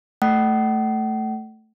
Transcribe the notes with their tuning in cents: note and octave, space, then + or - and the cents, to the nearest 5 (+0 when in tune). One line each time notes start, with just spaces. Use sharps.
A3 +0 F#5 +45